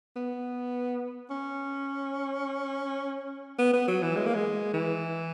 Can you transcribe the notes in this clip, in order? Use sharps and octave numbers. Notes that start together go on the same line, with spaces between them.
B3
C#4
B3
B3
F#3
E3
G#3
A#3
G#3
E3